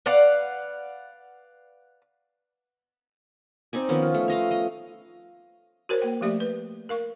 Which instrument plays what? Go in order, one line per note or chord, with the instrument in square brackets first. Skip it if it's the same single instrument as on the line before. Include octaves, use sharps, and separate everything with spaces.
[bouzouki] B4 D5 F5 F#5
[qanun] C4 D#4 D5 G#5
D#3 F3 B3 C#4
F4
A3
C#5 D#5 F5
D#5
[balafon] F#4 A#4 C5 C#5
A#3 G5
F3 A3 G4 D5 E5
B4
A#4 F5 C#6